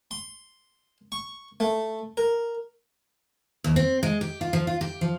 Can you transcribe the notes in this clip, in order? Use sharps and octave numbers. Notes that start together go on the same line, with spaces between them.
C6
C#6
A3
A#4
D#2
C4
G#3
G4
F4
F3
F4
G4
F3